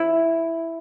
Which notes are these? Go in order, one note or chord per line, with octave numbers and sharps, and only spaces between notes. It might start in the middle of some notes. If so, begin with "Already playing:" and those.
Already playing: E4